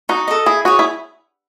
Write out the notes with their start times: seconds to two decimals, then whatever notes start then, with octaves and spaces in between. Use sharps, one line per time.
0.09 D#4 F#4
0.28 A4 D#5
0.46 E4 G#4
0.65 F#4 G#4 C#5
0.79 E4